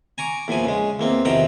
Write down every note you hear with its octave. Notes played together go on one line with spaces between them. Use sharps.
G#5 A#5 C#6 D6
E2 A#2 F3 G#5
C#3 G#3
E2 A#3 C4
E2 C3 D#3 F3 G5 A#5